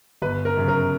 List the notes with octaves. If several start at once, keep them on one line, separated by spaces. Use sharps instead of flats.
G1 B4
A#4
F#2 C#3
A#4